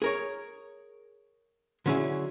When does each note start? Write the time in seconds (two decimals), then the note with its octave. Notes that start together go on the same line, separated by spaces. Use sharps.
0.02 G#4 A#4 C#5
1.86 D3 F#3 C#4 E4 G#4